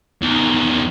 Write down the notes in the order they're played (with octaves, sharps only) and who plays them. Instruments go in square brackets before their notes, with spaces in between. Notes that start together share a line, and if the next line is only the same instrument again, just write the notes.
[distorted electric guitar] E2 D#3